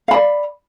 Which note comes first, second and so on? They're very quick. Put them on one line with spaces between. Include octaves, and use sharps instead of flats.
F5 B5 D5